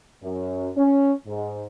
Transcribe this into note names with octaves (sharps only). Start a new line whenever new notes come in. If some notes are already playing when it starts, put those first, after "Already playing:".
F#2
C#4
G#2